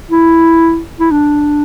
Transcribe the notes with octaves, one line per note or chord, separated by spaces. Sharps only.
E4
E4
D4